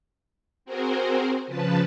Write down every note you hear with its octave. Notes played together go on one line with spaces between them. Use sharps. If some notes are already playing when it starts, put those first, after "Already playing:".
C4 F#4 G#4 A#4 C5
C#3 F3 B4 A5